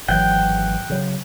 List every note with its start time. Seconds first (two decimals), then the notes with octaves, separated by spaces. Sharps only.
0.08 G#1 E3 F#3 F#5 G5
0.90 C#3 F#3